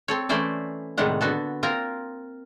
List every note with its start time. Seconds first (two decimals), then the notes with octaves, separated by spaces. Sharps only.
0.08 C4 A4 C#5
0.29 E3 A3 C#4 E4 C5 D5
0.98 A2 C3 D#3 G3 G#3 F#5
1.21 D3 B3 F#4 A4
1.63 A#3 C4 F4 A#4 A#5